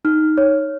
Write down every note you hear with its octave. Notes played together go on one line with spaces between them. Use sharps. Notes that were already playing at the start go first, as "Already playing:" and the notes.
D#4 F6
C#5